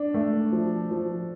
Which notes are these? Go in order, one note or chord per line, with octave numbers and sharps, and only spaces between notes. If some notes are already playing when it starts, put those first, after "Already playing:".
Already playing: D4
A3
F3
F3